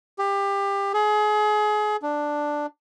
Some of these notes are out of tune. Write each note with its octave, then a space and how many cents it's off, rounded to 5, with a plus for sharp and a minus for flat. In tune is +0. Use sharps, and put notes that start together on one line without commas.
G4 +25
G#4 +30
D4 +5